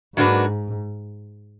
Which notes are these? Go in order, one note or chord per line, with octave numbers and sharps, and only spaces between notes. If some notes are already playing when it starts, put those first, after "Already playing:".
G#2 F#3 A#3 D4 F#4 B4